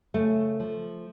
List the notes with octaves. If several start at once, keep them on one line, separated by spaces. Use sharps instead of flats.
C#3 A3
F3